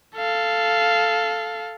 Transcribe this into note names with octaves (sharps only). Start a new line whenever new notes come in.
A4 F5